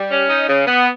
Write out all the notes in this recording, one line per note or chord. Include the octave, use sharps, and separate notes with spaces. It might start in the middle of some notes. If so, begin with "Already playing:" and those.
Already playing: G3
C#4
D#4
C#3
B3